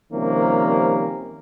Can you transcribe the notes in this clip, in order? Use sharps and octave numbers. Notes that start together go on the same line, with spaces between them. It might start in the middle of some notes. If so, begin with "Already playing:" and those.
C3 D#3 F3 G3 A#3 C#4